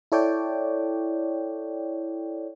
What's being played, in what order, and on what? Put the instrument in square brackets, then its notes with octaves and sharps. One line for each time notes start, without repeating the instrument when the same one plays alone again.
[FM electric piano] E4 A4 C#5 D5 G5